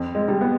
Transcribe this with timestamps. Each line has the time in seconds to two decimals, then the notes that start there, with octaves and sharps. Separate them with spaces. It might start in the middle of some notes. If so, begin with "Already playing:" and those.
Already playing: F2
0.15 G#3
0.28 G3
0.41 B3